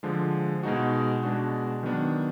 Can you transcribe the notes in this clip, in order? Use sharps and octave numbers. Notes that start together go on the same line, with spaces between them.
D3 F3 G#3
B2 G#3 D#4 F#4
B2 G#3 D4 F#4
D#3 F#3 B3 D4